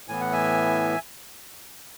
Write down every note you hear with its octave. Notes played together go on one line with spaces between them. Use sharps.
A2 E3 B3 G#5
F#5
E5 G#5